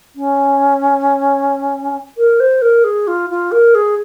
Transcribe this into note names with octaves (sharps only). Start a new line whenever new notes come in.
C#4
A#4
C5
A#4
G#4
F4
F4
A#4
G#4